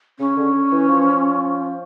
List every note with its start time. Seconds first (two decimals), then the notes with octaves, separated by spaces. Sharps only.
0.19 C#3 C#4
0.37 D3
0.72 E3
0.88 F3